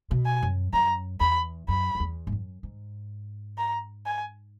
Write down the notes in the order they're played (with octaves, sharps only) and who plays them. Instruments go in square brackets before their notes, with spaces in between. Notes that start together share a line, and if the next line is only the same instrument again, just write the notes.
[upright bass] B2
[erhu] G#5
[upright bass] F#2
[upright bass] F#2 [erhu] A#5
[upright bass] E2 [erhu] B5
[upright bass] F#2 [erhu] B5
[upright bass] F#2
E2
G#2
F#2
G#2
[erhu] A#5
G#5